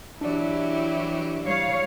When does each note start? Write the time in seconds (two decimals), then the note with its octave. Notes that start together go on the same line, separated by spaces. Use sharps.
0.21 E3 F#3 D4 E4 G4 D5
1.45 G3 C#5 F5